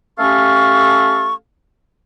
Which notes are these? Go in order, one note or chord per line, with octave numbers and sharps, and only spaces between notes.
A3 C#4 G4 A4 F5 C#6